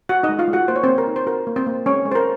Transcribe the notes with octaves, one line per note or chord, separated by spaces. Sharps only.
F#4 F#5
D#4 D#5
G#3
F4 F5
G#3
F#4 F#5
A#3 C5
C#5
C4 C5
A#3
A#4
D#4
C5
F#4 A#4
A#3
C4 C5
A#3
G#3 C#4 C#5
G#3
C5
A#4